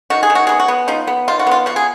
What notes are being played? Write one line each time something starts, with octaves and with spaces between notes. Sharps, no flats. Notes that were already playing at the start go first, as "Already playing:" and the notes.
D#3 F#4
G#4
D#3
F#4
B3 G#4
F#4
B3
F3 D#4
B3
D#3 F4
F#4
B3 F4
F3 F#4
G#4